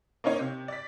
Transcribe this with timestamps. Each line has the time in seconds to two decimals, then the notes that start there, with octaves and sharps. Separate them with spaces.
0.24 A#3 C#4 D#4 C#5
0.39 C3
0.68 D5 B6